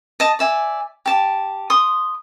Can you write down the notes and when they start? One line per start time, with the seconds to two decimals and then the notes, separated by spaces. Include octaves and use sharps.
0.20 D#5 A5
0.39 D5 E5 G#5
1.06 G4 A5
1.70 C6 D#6